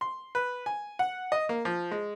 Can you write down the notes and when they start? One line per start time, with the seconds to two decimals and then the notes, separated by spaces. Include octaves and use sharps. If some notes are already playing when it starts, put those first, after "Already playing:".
0.01 C6
0.35 B4
0.66 G#5
0.99 F#5
1.32 D#5
1.49 A#3
1.65 F3
1.91 G#3